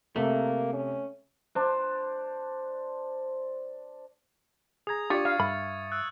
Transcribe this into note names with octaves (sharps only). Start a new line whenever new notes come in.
C3 A3 A#3
C#4
D4 C5
G#4 A#5 D#6 G#6
D4 F4 G4 D5 C#6 A6 C#7
F5
G2 E5 B5
E6 F#6